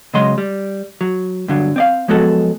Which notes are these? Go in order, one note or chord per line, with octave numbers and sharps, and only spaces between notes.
C#3 F#3 G#3 D#5 C6
G3
F#3
G2 D3 F#3
C4 D5 F5
F3 F#3 G#3 B3 F#4 A4